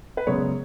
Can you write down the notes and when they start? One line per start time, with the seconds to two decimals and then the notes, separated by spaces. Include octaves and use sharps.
0.17 B4
0.27 F#2 C#3 G#3 B3 C#5